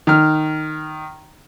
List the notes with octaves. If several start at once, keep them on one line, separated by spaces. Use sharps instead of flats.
D#3 F6